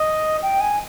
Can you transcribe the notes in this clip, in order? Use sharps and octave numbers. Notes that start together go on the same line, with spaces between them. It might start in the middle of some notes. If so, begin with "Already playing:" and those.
Already playing: D#5
G5
G#5